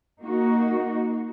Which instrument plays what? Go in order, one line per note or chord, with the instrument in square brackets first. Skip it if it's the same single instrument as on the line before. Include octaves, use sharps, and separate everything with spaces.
[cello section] A#3 D#4 F#4